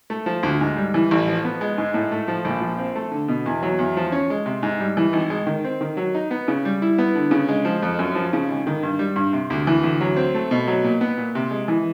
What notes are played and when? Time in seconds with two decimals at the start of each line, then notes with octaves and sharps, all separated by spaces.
0.10 A3
0.26 F3
0.43 D2
0.61 G#2
0.77 G3
0.94 E3
1.11 A1
1.27 F3
1.45 B3
1.61 G#3
1.78 G#2
1.94 A2
2.11 A3
2.28 F3
2.45 A#1
2.61 F3
2.78 C4
2.95 A3
3.11 D3
3.28 B2
3.46 E2
3.63 F#3
3.79 E2
3.97 F3
4.12 C#4
4.30 G#3
4.46 C3
4.63 G#2
4.80 G3
4.97 E3
5.13 G#1
5.30 G#3
5.47 D#3
5.64 C4
5.81 D#3
5.97 F#3
6.15 D#4
6.31 B3
6.48 C#3
6.65 G3
6.82 E4
6.98 B3
7.15 D3
7.31 C#3
7.49 G#3
7.65 F3
7.83 F2
7.99 F#2
8.15 F3
8.33 C#3
8.49 G#1
8.67 D#3
8.83 G2
8.99 G3
9.16 G2
9.33 C3
9.50 D2
9.67 E3
9.83 D2
10.01 F#3
10.17 C4
10.34 A3
10.51 B2
10.68 F#3
10.84 A#2
11.01 B3
11.18 A#2
11.35 C3
11.51 G#3
11.68 E3